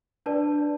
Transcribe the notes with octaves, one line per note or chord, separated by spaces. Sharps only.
D4 B4 D5 A5